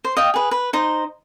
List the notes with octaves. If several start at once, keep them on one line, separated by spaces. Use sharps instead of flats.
C5
D#5 F5 G5
G#4 B4
B4
D#4 C5